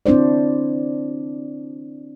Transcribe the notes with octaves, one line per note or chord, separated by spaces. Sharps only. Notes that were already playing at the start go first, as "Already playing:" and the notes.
C4 D4 E4 C5 D5